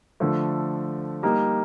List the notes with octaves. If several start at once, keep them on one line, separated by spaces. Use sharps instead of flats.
D3 F3 A3
G3 A#3 D#4